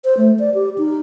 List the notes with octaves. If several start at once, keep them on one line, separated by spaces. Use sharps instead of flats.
C5
A3
D5
G4
D#4